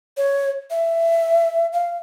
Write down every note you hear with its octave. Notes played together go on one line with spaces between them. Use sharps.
C#5
E5
F5